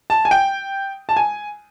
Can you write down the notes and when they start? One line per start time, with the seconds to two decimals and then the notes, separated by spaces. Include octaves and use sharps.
0.10 A5
0.25 G#5
0.31 G5
1.09 A5
1.16 G#5